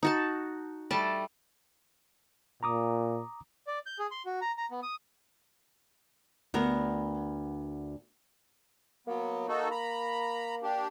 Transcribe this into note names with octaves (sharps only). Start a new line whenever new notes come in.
D#4 F#4 A5
G3 A3 A5
A#2 A#5 D6 D#6
D5
G6
G#4
C6
F#4
A#5
A#5
B3
D#6
D2 B3 A#4
F#3 A#3 B3
D#4 F#4 A4
A#5 B5
D4 G4